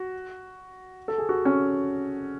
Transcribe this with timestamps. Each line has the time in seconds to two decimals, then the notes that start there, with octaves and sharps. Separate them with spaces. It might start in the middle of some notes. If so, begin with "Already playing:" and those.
Already playing: F#4
1.08 A4
1.18 G#4
1.29 F#4
1.45 C#4